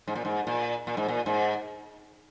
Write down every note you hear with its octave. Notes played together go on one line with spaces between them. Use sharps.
G#2
A#2
G#2
A#2
A#2
G#2
A#2
G#2